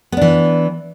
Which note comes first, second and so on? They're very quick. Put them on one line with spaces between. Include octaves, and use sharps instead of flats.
B3 D4 E3